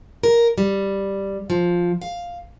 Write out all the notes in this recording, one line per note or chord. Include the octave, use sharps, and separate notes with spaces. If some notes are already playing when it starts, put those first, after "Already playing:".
A#4
G3
F3
F5